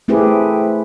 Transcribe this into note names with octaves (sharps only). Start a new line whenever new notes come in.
A3 C4 E4 G4 G#4 B4